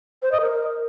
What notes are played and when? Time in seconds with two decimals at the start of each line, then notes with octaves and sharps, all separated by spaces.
0.22 C5
0.32 D#5
0.41 A#4